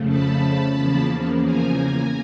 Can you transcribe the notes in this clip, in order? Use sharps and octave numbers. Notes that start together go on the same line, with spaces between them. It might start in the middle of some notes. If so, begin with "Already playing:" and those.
Already playing: F2 C#3 F3 A3
A5 B5
E2 C#3 F3 A#3
G#5 A#5